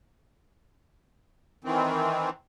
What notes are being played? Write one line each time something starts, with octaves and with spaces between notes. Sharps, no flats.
D#3 E3 C4